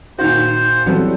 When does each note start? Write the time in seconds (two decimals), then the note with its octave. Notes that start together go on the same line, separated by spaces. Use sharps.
0.19 A#2 D#3 F#4 C5
0.86 E3 F#3 G3 B3 C4 A4